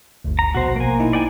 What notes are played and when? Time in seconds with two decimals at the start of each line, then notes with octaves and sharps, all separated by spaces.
0.24 G1 D2
0.39 A#5
0.55 A#1 B2 F#4 C5
0.76 A#3 G#5
1.00 D#4 E4
1.13 D5 G5 G#5